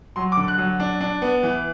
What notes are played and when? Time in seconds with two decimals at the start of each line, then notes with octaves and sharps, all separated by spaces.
0.16 F#3 C6
0.32 D6
0.37 D3
0.48 F#6
0.58 F#3
0.80 D4
1.01 D4
1.22 B3
1.43 E3